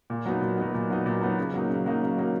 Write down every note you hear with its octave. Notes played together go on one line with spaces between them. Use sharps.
A#2
F#3 B3 D#4
A#2
F#3 B3 D#4
A#2
F#3 B3 D#4
A#2
F#3 B3 D#4
C#3
F#3 A#3 D#4
C#3
F#3 A#3 D#4
C#3
F#3 A#3 D#4